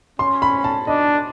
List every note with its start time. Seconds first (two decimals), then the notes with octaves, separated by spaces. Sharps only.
0.19 C#4 C6
0.42 B5
0.64 A5
0.87 D4 D#5